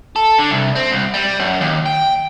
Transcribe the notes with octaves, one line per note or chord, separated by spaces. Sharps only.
A4
D3
C2
C4
C2
G3
F#2
D#2
G5